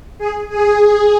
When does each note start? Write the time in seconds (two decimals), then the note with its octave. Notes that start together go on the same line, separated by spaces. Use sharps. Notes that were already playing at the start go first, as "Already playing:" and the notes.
0.18 G#4
0.49 G#4
0.79 G#4